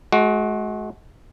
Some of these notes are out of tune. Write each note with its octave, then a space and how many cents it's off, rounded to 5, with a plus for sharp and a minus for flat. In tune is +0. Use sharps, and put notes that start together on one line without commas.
G#3 +40 F#4 +0